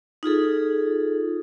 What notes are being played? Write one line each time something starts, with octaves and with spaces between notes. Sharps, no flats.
D#4 F4 G#4 A4